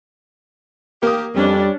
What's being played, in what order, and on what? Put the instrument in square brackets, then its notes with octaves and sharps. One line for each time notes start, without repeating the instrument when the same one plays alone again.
[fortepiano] A#3 D#6 [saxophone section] G4 A#4
[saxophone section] F2 [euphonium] G3 [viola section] C#4 D4